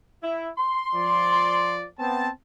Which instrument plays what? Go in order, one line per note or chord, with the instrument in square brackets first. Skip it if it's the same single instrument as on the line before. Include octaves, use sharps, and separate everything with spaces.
[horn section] E4
C6
[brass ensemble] F3 D5
B3 C4 A5